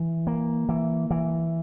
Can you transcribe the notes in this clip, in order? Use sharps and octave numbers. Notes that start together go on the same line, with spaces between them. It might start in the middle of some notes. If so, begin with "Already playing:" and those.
Already playing: E3
A#3
E3
E3